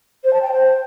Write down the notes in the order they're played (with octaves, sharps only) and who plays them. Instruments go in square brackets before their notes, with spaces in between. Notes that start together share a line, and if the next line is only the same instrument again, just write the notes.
[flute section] C5
A5
G5
C5